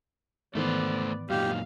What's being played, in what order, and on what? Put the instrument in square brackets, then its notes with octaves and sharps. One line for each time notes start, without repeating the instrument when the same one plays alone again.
[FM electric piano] G#2 D#3 E3 [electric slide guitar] A3 A4 C5 [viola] B3 D5
[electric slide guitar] F#2 A#2 D#4 [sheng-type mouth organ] G4 [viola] F5